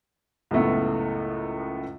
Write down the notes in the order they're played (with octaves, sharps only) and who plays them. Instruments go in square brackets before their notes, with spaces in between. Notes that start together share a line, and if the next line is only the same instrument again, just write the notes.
[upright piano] C#2 F#2 A2 A3 B3